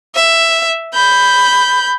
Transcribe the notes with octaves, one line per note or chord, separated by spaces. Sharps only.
E5
B5 G6